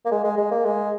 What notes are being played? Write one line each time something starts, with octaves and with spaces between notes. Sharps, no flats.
A#3
G#3
G#3
G#3
A#3
G#3